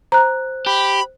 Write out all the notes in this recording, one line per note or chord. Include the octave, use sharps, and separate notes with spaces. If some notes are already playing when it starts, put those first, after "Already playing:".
C5 A#5 F#6
G4 B5